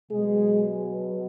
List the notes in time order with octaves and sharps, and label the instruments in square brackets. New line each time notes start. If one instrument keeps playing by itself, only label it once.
[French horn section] B2 F#3 G#3 G#4